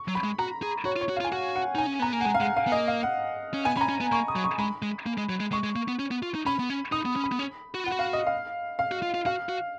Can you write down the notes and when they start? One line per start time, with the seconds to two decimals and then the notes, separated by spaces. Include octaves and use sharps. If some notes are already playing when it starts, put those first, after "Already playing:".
Already playing: C#6
0.08 F#3
0.15 B5
0.24 G#3
0.39 F#4 A#5
0.62 G#4
0.85 F#4 C#5
0.96 F4
1.01 C#5
1.09 F#4
1.16 F4 F5
1.25 G#5
1.32 F#4 F#5
1.56 F#5
1.75 D#4 G#5
1.87 C#4
1.99 B3 A#5
2.13 A#3
2.21 F#5
2.25 G#3 G#5
2.34 F5
2.40 G#3 F#5
2.57 F5
2.67 B3
2.72 A#3 D#5
2.88 F5
3.03 F#5
3.54 C#4
3.65 B3 G#5
3.77 C#4 B5
3.81 A#5
3.89 C#4
4.01 B3
4.12 A#3 C#6
4.28 D#6
4.36 F#3
4.44 C#6
4.59 G#3 B5
4.82 G#3
5.06 A#3
5.18 G#3
5.29 F#3
5.40 G#3
5.52 G#3 C#6
5.64 G#3
5.76 A#3
5.88 B3
5.99 C#4
6.11 B3
6.23 F4
6.35 D#4
6.46 C#4 B5
6.59 B3
6.70 C#4
6.92 D#4 D#6
7.05 B3
7.16 C#4
7.24 B5
7.32 B3
7.39 C#4
7.74 F#4
7.84 F4 F#5
7.92 F#4
7.99 F5
8.13 D#5
8.27 F5
8.79 F5
8.91 F#4
9.03 F4
9.14 F4
9.26 F#4 F5
9.49 F#4